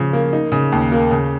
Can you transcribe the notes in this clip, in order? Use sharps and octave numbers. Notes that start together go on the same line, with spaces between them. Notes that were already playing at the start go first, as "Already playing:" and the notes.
Already playing: C#3 F3
A#3
D#4
C#3
D#2
A#3
C#3